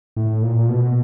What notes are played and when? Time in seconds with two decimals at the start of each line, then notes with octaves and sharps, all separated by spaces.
0.17 A2
0.42 A#2
0.69 B2